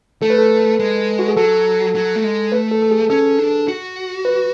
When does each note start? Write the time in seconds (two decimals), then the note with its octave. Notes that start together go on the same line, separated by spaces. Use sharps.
0.22 A3 A4
0.30 B4
0.39 A4
0.79 G#3
1.19 F#4
1.28 G#4
1.37 F#3 A4
1.95 F#3
2.16 A3
2.24 G#3
2.52 A3 B4
2.72 A4
2.82 A4
2.91 G#4
3.10 C#4 A4
3.39 D4
3.68 F#4
4.25 B4